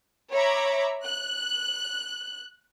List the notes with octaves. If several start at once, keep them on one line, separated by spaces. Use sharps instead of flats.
C#5 E5 A#5 B5 D6
F#6